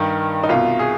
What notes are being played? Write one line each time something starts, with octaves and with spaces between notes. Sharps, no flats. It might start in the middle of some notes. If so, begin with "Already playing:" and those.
Already playing: G2 D#3
D#4
C2 B2 F4
G#4